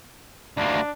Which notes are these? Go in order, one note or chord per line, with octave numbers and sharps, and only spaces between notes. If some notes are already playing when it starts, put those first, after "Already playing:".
D2 A#3 D4